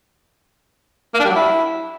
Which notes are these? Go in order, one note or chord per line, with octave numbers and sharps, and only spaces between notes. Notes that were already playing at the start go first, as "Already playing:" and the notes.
A#3
D4
G3
F#3
E4